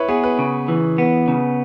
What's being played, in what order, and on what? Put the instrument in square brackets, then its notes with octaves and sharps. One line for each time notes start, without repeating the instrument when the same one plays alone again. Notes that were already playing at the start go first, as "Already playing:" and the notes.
Already playing: [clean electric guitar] E4 [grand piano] B4 C#5
[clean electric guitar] B3 [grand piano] G#4
[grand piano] B4
[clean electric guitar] C#3
E3
B3
C#3